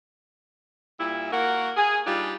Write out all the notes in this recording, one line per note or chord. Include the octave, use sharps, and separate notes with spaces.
A#2 G3 E4
A#3 F#4 A#4 F#5
G#4
G3 D4 D#4 F4